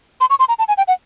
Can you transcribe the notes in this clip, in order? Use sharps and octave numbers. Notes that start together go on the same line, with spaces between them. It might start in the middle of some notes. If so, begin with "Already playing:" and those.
C6
C#6
C6
A#5
A5
G#5
G5
F#5